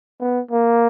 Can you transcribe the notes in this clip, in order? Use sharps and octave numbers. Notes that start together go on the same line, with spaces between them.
B3
A#3